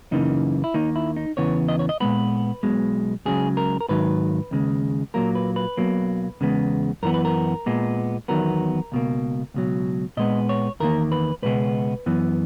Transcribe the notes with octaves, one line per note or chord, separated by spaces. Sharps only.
F#2 C#3 E3 A#3 D#4
E4
D#2 D#3 A#3 D#4
E4
D#4
E2 C#3 E3 B3 C#5
D#5
C#5
D#5
A#2 G#3 B3 B4
B1 B2 G#3
C#2 C#3 F#3 G#4
A#4
A#4
G#2 D#3 F#3 B4
D#2 C#3 G#3
A#2 F#3 A#3 A#4
B4
B4
B1 B2 F#3 A#3
E2 C#3 G#3 B3
F#2 E3 B3 A#4
B4
A#4
A#2 G#3 B3
E2 D#3 F#3 B3 A#4
C#2 B2 A#3
C#2 B2 F#3
A#2 G#3 B3 D#5
C#5
E2 D#3 A#3 A#4
B4
C#2 B2 G#3 B3 B4
F#2 E3 B3